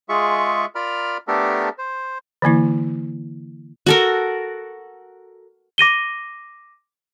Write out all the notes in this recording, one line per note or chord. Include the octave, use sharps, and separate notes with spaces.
G#3 F4 G#4 E5 C#6
F4 A#4 D5 A#5 B5 F6
A3 B3 D4 G4 A4 A#4
C5
D3 E3 A#3 E4
F#4 A4 A#4
D6 A#6 D#7 G7